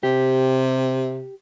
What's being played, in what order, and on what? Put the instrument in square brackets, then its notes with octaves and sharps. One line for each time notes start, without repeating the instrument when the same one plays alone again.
[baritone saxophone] C3 [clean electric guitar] G4